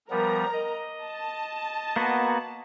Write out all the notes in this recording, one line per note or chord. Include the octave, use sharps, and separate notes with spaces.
F3 G3 B3 A#4 A#5
D#5
A5
A#3 B3 F#4